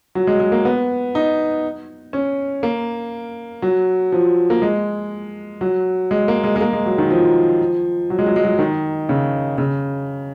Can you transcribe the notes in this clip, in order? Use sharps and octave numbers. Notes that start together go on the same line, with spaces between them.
F#3
G#3
G#3
A#3
B3
D#4
C#4
A#3
F#3
F3
A#3
G#3
F#3
G#3
A#3
G#3
G#3
A#3
G#3
F#3
D#3
F3
F#3
G#3
F#3
G#3
F#3
D#3
C#3
C#3